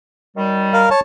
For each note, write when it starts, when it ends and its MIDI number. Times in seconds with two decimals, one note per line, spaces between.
0.36 0.88 42
0.36 0.88 51
0.36 0.88 55
0.74 0.89 70
0.74 0.89 77
0.91 1.00 73
0.91 1.00 81